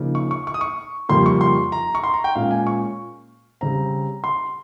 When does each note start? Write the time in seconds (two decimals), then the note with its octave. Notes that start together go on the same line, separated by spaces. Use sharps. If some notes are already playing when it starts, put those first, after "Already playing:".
Already playing: C#3 F3 A#3 D#4
0.15 C#6
0.31 C#6
0.47 C#6
0.54 D#6
0.61 C#6
1.09 F2 C#3 G3 A#3 C6
1.26 C#6
1.41 C6
1.72 A#5
1.95 C#6
2.04 C6
2.14 A#5
2.24 G5
2.35 A#2 G#3 C#4 F5
2.51 G#5
2.67 C#6
3.61 C#3 G3 C4 A#5
4.24 C6